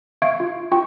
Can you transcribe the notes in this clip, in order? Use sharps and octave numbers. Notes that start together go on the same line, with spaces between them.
E5 F5 C#6 G#6 D7
F4
F4 G5 C#6